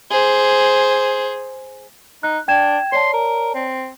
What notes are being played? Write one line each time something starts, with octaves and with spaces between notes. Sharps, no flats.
G#4 C5
D#4 F#6
D4 G5 G#6 E7
C#5 D5 A5 C6
A#4
C4